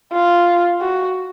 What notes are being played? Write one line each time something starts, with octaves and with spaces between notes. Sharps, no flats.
F4
F#4